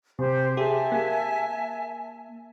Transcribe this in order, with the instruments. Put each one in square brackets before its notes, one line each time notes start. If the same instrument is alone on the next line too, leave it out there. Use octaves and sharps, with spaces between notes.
[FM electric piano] C3 [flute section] G4 C5
[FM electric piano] G4 G#4 [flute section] E5 G#5 A5
[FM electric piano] A#3